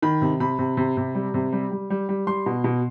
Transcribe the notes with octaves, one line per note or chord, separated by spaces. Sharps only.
D#3 B5
C3
C3 B5
C3
C3
C3
G3
C3
G3
G3
G3
G3
G3 C6
B2
B2